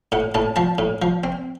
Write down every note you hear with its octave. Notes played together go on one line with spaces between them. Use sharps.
A2 F#5
A2 A5
F3 A5
A2
F3
C4